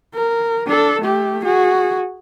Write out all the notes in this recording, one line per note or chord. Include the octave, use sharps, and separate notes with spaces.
A#4
D4 A4
A3 G4
F#4 G#4